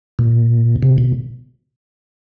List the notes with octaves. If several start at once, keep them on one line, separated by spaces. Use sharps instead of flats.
A#2
C3
B2